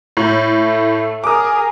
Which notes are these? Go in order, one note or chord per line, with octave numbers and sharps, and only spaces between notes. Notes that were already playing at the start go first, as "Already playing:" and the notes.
A2
A3
G#4 A#4 D6 D#6